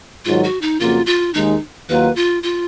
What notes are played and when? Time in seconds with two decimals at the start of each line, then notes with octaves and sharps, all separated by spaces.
0.25 G#2 D#3 F#3 F4
0.44 F#4
0.62 D#4
0.79 F2 C#3 F#3 A#3 F4
1.06 F4
1.34 D#2 D#3 G#3 D#4
1.89 D#2 D#3 F#3 A#3 F4 B4
2.16 F4
2.43 F4